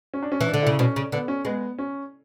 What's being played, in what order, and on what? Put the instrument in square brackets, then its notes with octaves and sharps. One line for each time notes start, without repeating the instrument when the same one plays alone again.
[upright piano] C#4
D4
C#4
[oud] E3
[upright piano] D4
[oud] D3
[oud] C#3 [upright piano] E4
[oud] B2 [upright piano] C#4
[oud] C#3
[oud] D3 [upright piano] B3
[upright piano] C#4
[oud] G#3 [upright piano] B3
[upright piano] C#4